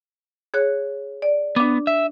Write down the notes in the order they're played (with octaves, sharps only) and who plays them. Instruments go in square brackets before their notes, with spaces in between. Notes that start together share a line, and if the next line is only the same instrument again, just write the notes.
[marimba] G#4 C#5 F#6
D5
[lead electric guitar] B3 [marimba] D4 D6
[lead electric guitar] E5